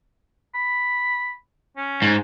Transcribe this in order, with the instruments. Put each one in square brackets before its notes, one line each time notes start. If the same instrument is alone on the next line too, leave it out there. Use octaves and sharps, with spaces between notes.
[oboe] B5
C#4
[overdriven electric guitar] G#2